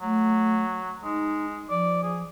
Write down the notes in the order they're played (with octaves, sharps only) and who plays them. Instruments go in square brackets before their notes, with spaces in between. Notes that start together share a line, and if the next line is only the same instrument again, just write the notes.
[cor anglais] F#3 [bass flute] A3
[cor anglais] G#3 [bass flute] D#4
[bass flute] F3 [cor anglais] D5
[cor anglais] G#4